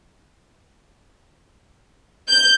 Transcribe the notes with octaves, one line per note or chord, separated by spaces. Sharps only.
G6